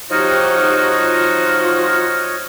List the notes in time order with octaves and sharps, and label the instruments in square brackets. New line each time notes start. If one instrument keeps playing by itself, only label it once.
[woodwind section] F3 D#4 F#4 [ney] G4 [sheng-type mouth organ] C#5 D#5 [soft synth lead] F6
[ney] F4